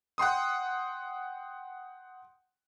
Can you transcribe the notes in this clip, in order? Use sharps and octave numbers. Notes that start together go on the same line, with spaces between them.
F#5 G5 C6 D#6